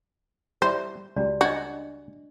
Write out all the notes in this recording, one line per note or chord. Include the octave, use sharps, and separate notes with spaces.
G3 E4 C5 D5
C#2 G3 F#4 D5
D4 F#4 D#5